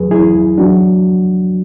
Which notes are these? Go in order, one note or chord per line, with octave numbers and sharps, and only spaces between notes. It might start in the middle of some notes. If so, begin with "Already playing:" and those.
Already playing: E2 F#3 G#4 B4
E2 E4 G#4
E2
F#3 D4 F#4